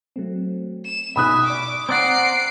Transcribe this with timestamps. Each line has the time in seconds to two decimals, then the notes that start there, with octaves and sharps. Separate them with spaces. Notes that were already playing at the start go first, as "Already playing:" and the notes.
0.16 F#3 A3 C4
0.85 E7
1.16 G#1 B2 D#4 E5 G#5 B5 D#6 F#6
1.45 D5 C#6 D6 F6
1.89 C4 D5 F#5 A#5 A#6 C7 D7